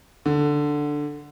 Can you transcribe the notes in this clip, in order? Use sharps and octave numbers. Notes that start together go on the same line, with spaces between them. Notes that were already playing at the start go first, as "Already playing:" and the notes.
D3